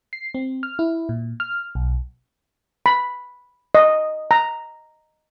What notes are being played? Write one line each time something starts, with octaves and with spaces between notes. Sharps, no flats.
C7
C4
F6
E4
A#2
F6
B1
B5
D#5
A#5